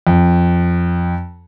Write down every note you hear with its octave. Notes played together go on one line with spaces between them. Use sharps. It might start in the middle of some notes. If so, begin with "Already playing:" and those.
F2